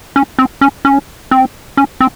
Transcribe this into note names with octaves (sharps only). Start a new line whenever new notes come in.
C#4
C4
C#4
C#4
C4
C#4
C4